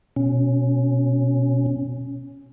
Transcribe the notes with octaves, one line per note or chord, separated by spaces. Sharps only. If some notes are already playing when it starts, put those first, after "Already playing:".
B2 C#4